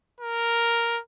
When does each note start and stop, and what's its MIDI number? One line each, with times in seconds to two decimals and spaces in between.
0.21 1.00 70